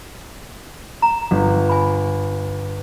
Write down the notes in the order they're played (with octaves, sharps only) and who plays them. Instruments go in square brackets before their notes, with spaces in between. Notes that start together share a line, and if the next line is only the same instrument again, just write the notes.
[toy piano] A#5
[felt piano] G1
[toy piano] G#5 B5